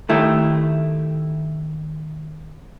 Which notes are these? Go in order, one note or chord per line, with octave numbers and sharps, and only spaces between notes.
D#3 A3 E4 G4